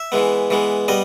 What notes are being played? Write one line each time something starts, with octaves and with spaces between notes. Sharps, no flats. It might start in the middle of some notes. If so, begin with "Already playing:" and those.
Already playing: E5
E3 G#3 B3
E3 G#3 B3
G3 B3 D#5